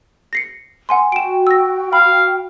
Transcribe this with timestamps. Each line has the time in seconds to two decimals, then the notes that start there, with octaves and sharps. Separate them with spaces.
0.33 A#6 C7 C#7
0.89 F#5 G#5 C6
1.12 F#4 G5 D7 E7
1.47 E6 A#6
1.93 F5 B5